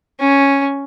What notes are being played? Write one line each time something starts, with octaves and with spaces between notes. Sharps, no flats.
C#4